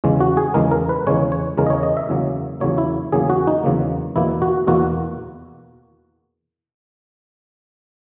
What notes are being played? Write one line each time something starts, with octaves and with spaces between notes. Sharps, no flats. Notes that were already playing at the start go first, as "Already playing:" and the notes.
E2 C#3 G#3
F#4
G#4
E2 C#3 G#3 A#4
A#4
B4
E2 C#3 G#3 C#5
C#5
E2 C#3 G#3 A#4
D#5
C#5
D#5
E5
E2 C#3 F#3 A#3
E2 C#3 F#3 A#3 C#5
E4
E2 C#3 F#3 A#3 G#4
F#4
D#4
E2 C#3 F#3 A#3
E2 B2 A#3 E4
F#4
E2 B2 A#3 F#4